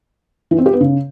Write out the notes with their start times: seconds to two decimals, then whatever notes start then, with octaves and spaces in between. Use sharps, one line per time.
0.51 E3
0.58 C4
0.66 G4
0.73 B3
0.81 C#3